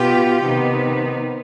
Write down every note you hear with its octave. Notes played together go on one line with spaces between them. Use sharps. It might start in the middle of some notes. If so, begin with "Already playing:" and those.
Already playing: B2 B3 F4 G4
C3 D#3 B3 D#4